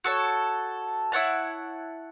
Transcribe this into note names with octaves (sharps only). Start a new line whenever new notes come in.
F#4 A4 C#5
E4 C#5 F#5 A5